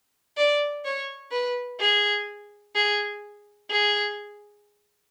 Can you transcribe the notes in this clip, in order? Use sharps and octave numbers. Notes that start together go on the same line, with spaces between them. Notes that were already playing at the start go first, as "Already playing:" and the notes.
D5
C#5
B4
G#4
G#4
G#4